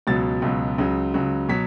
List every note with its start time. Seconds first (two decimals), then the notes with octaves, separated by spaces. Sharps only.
0.07 C#2 B2 F#3 A6
0.42 C#2 B2 F#3
0.78 C#2 C#3 F#3
1.14 C#2 C#3 F#3
1.49 B2 F#3 B6